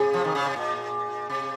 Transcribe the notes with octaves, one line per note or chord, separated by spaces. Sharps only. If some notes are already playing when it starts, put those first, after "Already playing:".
Already playing: C3 G#4
F3
D#3
C#3
C3
A#2
C3